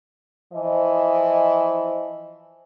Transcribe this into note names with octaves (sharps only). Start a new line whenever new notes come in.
E3 F3 C5 D#5